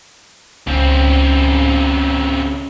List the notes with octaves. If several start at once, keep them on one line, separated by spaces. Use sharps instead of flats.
C#2 C#3 C4